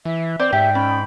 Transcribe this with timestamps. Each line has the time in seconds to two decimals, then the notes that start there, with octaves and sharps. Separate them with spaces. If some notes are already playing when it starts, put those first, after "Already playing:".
0.05 E3 E5
0.40 C4 C5 D5
0.53 G#2 G4 D5 E5 G5
0.75 C#4 B5